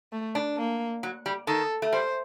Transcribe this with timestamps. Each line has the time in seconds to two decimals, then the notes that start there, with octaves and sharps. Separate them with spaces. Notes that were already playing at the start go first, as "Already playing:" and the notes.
0.12 A3
0.35 D4
0.57 A#3
1.03 F#3
1.26 G3
1.47 D#3 A4
1.82 A3
1.93 G3 C5